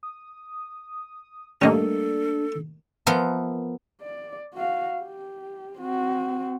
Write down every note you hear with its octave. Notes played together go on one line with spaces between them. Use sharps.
D#6
G3 A3 A#3 C#4 D4 A4 D#5
F3 B3 A#4 E5 C6
D5
F#4 F5
G4
C4 F#4